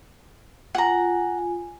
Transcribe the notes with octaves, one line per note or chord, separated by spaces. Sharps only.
F4 F#5 G#5 A#5